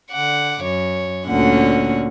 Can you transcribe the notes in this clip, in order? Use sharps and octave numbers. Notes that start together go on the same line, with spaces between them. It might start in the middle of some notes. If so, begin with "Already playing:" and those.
D3 F#5 D6
F#2 C#5
D2 A#2 D3 C#4 F#5